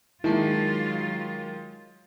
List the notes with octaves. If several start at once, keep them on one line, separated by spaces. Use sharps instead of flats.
D#3 F#3 G#3 A#3 E4 F4 A5 C7